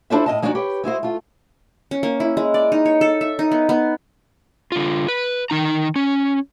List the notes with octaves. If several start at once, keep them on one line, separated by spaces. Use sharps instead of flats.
D4 E4 F4 A4 C5 E5
A2 C4 D#5 A5
F3 G#3 D4 D#4 F4 F#4
G4 B4 C#5
G#3 E4 F#4 C5
A3 F4
C#4
A#3
E4
G#3
D5
D#4
C#5
A4
E5
D#4
B3
B3
D3 F4
B4
D#3 D#4 A#5
C#4